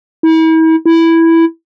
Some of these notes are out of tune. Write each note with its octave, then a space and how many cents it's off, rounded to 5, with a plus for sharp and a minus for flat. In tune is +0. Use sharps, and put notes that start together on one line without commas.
E4 -40
E4 +0